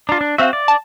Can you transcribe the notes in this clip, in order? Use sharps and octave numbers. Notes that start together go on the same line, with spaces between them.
D4 F4 A#5
D4
C4 F#4 E5 F5
D5
A5